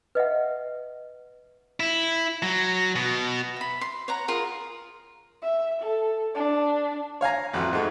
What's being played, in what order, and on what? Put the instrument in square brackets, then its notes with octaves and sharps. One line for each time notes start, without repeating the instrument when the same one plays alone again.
[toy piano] B4 D#5 E5 F#5
[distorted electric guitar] E4
F#3
B2
[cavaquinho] E5 B5
C6
C#5 F#5 A#5
F4 G#4 A#4
[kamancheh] E5
A4
D4
[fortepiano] C#5 F5 G#5 A#5
A1 F2 F#4
G#2 G#3 A3 F#4